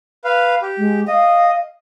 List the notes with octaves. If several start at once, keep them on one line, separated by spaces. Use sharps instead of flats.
B4 F5
G4
G#3
D#5 F5